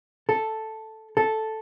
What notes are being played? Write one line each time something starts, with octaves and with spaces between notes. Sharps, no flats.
A4
A4